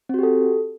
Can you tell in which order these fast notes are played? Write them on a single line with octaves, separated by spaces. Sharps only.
C4 F#4 G4 A4